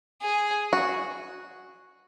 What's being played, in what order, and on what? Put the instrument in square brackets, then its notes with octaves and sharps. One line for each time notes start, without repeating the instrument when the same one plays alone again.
[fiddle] G#4
[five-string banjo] F#4